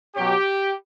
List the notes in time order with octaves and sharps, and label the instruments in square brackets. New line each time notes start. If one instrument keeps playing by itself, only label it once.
[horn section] B2 F#3 C#4 G4